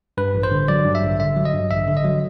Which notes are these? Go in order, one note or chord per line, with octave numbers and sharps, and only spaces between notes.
G2 B4
A1
C5
D3
F#3 D5
G2
E5
A1
D3 E5
F#3
D#5
G2
A1 E5
D3
D#5
F#3